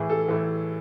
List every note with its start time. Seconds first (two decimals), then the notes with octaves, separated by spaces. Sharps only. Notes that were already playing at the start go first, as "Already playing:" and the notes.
Already playing: A2 E3 G#4
0.10 A4
0.28 A2 E3